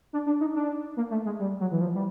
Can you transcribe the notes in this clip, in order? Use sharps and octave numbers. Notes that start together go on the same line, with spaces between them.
D4
D4
D#4
D4
A#3
A3
G#3
G3
F#3
E3
F3
G3